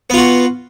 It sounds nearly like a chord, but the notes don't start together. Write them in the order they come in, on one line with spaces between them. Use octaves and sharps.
B3 F4 F#4